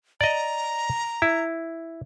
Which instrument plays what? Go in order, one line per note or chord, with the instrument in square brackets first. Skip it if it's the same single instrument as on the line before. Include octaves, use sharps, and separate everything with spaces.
[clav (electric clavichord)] D5 D#5 [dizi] A#5
[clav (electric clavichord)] E4